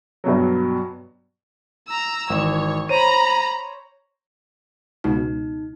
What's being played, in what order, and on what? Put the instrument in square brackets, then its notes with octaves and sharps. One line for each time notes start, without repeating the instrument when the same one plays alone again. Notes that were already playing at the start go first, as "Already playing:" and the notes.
[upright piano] G2 B2 F#3
[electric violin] A#5 E6
[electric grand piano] G#1 E3 E7 [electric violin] C#5
[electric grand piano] C5 C#5 D#7 [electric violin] A#5 B5
[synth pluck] C#2 B2 [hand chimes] D#4